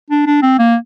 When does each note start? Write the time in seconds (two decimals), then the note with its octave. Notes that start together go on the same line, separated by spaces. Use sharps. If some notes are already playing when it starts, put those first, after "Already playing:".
0.10 D4
0.27 D4
0.42 C4
0.59 A#3